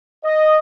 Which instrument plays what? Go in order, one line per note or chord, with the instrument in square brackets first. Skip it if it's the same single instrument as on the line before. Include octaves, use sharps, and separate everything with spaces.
[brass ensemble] D#5